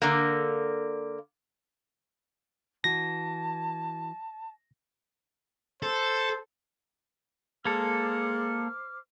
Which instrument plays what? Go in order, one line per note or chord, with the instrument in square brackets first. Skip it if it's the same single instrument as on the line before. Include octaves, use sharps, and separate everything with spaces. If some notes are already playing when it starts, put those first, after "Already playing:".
[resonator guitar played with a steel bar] D3 A#3
[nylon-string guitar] E3 F#4 [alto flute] A5 [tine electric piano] A#6
[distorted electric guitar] A4 [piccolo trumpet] C5
[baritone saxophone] G#3 [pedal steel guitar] A#3 A4 [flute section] C5 D6 F6